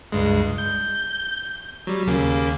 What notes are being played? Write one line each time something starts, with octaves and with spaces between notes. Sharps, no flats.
C#2 G2 G#3
G6
F#3 G3
D#2 C#3 A#3